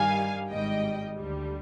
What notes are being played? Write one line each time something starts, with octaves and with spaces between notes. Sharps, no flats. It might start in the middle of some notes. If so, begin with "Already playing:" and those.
Already playing: G2 D#3 G3 F5 G#5
G#1 G#2 G3 D#5 G5
D2 D3 G3